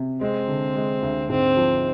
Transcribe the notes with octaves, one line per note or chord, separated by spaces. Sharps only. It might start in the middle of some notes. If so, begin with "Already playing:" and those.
Already playing: C3
G#3 C4
D3
G#3
D2
G#2 C4
F3